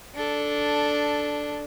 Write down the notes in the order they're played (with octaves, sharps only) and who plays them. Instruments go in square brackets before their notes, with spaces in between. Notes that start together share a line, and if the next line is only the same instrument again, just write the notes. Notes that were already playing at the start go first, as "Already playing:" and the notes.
[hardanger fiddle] D4 A4